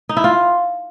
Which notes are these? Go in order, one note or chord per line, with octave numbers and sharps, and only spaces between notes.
D#4
E4
F4